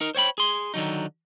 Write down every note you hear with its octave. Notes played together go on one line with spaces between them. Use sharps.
D#4 A#4
C5 C#5 G5 B5
G#4 C6
D3 D#3 F#3 D#4